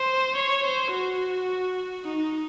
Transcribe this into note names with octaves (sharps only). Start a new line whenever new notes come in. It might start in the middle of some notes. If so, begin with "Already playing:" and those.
Already playing: C5
C#5
C5
F#4
D#4